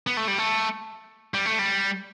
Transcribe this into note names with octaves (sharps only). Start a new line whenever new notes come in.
B3
A3
G3
A3
G3
A3
G3